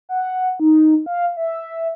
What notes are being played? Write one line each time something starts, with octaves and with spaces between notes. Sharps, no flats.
F#5
D#4
F5
E5